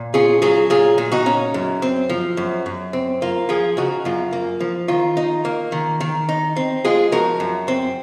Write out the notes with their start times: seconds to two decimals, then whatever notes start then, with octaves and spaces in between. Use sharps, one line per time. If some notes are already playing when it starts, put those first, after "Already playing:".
Already playing: A#2
0.14 C#4 F4 G#4
0.42 F#3 F4 G#4
0.70 A#2 F4 G#4
0.98 A#2
1.12 D#4 F#4
1.26 C#4
1.54 F#2
1.82 C4
2.10 F3
2.37 F#2
2.66 F#2
2.93 C4
3.22 A#3 F4
3.49 F3 F4 G#4
3.77 C#3 D#4 F#4
4.05 F#2 F4
4.33 A#3
4.60 F3
4.88 D#3 F4
5.17 D#4
5.45 A#3
5.72 D#3
6.01 D#3
6.29 D#4
6.56 C4
6.85 G#3 F4 G#4
7.12 F3 F#4 A#4
7.40 F#2
7.68 C4